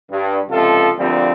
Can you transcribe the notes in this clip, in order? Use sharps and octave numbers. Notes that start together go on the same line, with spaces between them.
G2
C#2 C3 F3 F4 A4
D2 F3 G3 A#3 C4